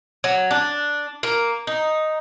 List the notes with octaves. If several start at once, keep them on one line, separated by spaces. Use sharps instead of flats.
F#3
D4
A#3
D#4